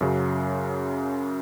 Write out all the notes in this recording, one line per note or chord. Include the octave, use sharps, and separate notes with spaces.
F#2 C#3 F#3